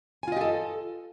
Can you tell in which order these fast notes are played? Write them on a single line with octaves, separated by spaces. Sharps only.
G#5 F4 D#5 G4 A4